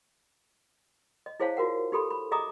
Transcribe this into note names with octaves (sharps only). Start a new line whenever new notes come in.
D#5
E4 G#4 C5 C#5 F5 A5
F4 F#4 A#4 F#5
D#4 G4 A4 B5 C6
B5
G#4 D#5 E5 A#5 D6 D#6